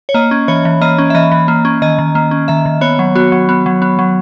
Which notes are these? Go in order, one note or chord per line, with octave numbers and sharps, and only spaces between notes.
C#5
A#3 D#5
C#4
E3 C#5
E3
A#3 D#5
C#4
E5
E3 D#5
E3
A#3
C#4
D#3 D#5
D#3
A#3
C#4
D#3 E5
D#3
B3 C#5
F#3
B3 F#4
F#3
B3
F#3
B3
F#3